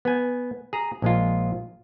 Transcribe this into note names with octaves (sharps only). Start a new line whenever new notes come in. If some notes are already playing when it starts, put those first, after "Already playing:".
B3 G#5
G#4 A#5
A#1 G#3 F4